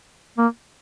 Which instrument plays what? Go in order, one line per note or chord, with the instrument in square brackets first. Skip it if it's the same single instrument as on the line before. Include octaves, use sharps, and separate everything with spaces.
[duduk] A#3